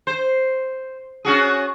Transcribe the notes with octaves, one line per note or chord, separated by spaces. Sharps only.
C5
C#4 F#4 G#4